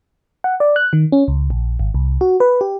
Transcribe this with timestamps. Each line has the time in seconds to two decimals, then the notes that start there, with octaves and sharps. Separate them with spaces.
0.44 F#5
0.60 D5
0.76 F#6
0.93 D#3
1.12 C#4
1.28 C#2
1.50 A#1
1.79 G#1
1.94 C2
2.21 F#4
2.40 B4
2.61 G4